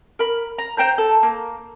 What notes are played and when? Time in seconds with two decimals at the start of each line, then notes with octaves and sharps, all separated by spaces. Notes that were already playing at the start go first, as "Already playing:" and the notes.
0.19 A#4 B5
0.58 A#5
0.77 C5 G5 A#5 G6
0.98 A4
1.23 A#3